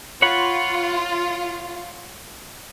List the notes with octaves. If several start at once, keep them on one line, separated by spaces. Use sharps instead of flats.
F4 C#5 F#5 B5